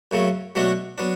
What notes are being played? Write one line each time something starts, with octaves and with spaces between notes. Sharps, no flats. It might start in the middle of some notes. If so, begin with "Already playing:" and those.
F#2 C#3 F#3 A3
B2 F#3 A3 D4 F#4
F#3 B3 D4